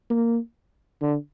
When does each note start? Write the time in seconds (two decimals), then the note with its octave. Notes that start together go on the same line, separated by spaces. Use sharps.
0.10 A#3
1.01 D3